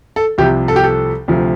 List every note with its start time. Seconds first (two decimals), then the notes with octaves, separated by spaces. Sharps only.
0.16 A4
0.38 C2 C3 F3 G4
0.68 A4
0.76 G4
0.83 A4
1.28 D2 C3 F3